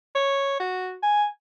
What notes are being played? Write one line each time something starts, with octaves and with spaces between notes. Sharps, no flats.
C#5
F#4
G#5